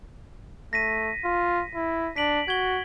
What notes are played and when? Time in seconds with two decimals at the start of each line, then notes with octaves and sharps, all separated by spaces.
0.73 A3 A#6 B6 D#7
1.24 F4
1.75 E4
2.16 D4 B6 D7 F#7
2.48 F#4 G#6 G7